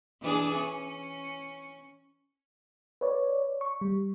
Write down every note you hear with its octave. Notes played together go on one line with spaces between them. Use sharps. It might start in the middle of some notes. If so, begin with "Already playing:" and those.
E3 D4 G#4
C#4
B4 C#5 D5
C#6
G3